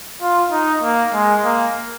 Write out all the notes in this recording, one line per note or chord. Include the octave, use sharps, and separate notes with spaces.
F4
D#4
A#3
G#3
A#3